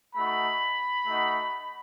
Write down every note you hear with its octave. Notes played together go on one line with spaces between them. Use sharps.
A3 D#4 F#4 B5
A3 D#4 F#4